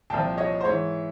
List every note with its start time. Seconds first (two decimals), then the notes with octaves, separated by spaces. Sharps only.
0.10 C2 A#2 F3 G5 A5
0.38 C#5 D#5
0.61 C5
0.65 G#2 E3 C#5